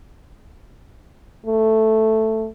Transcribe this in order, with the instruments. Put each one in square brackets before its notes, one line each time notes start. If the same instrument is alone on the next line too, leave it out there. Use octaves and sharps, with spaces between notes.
[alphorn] A3